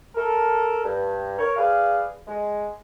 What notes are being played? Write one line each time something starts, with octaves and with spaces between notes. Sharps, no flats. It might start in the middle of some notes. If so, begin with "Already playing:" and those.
A4 A#4
G2
A#4 C#5
G#4 B4 D5 F5
G#3